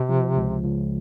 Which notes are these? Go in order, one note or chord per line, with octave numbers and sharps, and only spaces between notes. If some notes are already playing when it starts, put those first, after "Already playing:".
Already playing: C3
F3
C#2
C#2